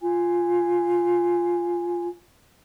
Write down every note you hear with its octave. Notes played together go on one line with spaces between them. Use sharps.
F4 G#5